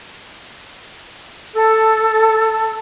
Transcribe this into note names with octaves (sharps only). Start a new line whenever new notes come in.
A4